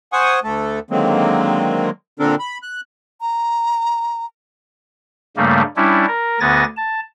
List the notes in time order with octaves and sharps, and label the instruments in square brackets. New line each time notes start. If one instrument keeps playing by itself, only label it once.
[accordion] C5 F#5 G#5 C#6 D#6
D2 A3 A4
D3 D#3 F#3 G#3 A#3 C4
A#2 D3 C4 D4 A4 A#4
B5
F#6
[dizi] A#5
[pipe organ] G2 C#3 G3 A3 A#3
G3 C#4 D4 E4
A#4
D2 D3 B3 G#5 A6 A#6
A5